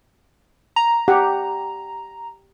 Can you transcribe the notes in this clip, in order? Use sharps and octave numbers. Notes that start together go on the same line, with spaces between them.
A#5
G4 F#5